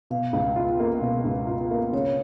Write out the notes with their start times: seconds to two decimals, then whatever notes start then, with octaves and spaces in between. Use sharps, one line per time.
0.10 B2 F5
0.33 C#2
0.56 F4
0.80 A#3
1.02 B2
1.25 C#2
1.47 F4
1.71 A#3
1.93 C#3 C#5